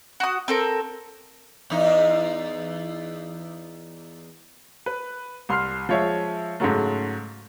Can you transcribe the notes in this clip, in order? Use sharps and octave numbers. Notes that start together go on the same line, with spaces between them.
F#4 D#6
C4 A4 A#4
E2 D#4
B4
C2 C6 F6 C7
F3 G#3 C#5 E5
G#2 C#3 F#3 A3